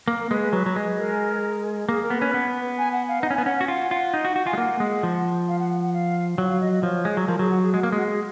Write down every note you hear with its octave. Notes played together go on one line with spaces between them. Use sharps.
A#3
A#4
G#3 B4
B4
F#3 B4
F#3
G#3
A#4
A#3 G#4
A#4
B3
C#4 B4
B3
G#5
F#5
F5
D#4 F#5
C#4
G#5
B3
C#4 F#5
F#5
F#4
F4 F#5
F4
D#4
F#4
F#4
F4 G#5
G#3
A#3 F#5
G#3
F3
F5
F#5
F#5
F#5
F5
F#3 F#5
F5
D#5
D#5
F3 C#5
G#3
F#3
F3 A#4
F#3 G#4
F#4
G#4
G#3 F#4
A#3
G#3 F#4
G#4